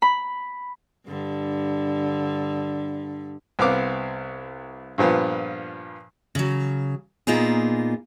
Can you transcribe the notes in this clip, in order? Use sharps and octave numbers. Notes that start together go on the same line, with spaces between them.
B5
G2 D3
C2 B3 C4 F5 D6
G2 A#2 F3 B3
C#3 F#3
A#2 A#3 B3 D#4 F4 G#4